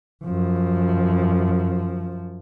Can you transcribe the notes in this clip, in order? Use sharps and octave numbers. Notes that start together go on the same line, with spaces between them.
F#2 F3